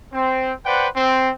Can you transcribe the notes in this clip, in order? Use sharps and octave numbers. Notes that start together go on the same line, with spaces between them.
C4
B4 C5 D5 F#5 G5
C4